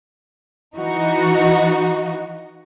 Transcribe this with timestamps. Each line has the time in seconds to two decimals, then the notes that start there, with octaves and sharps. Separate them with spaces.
0.75 E3 D#4 F#4